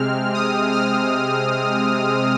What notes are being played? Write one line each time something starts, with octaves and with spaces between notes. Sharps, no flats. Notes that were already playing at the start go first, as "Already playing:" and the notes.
Already playing: C3 G#3 C4 F6
D#6
F6